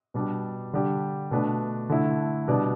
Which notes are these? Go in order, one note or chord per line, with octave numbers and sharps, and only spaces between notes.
B2 G3 D4 G4
D3 G3 D4 G4
B2 A3 D4 B4
D3 A3 E4
B2 G3 D4 B4 D5